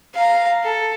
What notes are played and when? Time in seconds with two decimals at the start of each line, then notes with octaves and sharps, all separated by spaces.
0.14 F5 A#5
0.64 A4